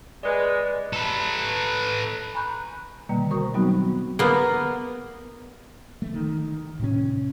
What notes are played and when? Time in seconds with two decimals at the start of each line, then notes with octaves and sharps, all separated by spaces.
0.23 G#3 B4 D5
0.93 A4 B4
2.34 G#5 A#5 B5 C#6 F#6 G6
3.09 B2 D3 D#3 G3 A3 A#3
3.30 F#4 A#4 C5 C#6 D#6
3.54 F#3 G3 B3 C4 D#4 F#4
4.19 A#3 B3
6.02 E3 A3
6.14 D#3
6.80 A2 C3 C4 C#4